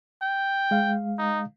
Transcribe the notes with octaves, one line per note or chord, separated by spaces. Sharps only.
G5
G#3 F5
D#4